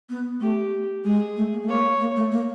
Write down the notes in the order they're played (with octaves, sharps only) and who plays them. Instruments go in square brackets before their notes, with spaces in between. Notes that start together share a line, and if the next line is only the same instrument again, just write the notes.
[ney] B3
[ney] A3 [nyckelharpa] G4
[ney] G#3 [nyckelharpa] G#4
[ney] A3
A#3
A3
[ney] A#3 [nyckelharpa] C#5
[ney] A#3
A3
A#3